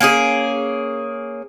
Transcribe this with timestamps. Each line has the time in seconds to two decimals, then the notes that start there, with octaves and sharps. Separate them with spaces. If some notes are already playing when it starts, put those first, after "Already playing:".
0.01 A#3 C#4 G4 G#4